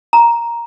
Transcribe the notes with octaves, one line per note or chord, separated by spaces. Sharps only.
A#5